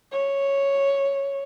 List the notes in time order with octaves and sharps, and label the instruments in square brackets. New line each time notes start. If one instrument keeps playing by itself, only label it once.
[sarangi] C#5